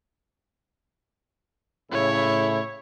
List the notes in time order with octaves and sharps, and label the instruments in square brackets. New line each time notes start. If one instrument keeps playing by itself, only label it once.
[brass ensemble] A2 C#3 E4 [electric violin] C#5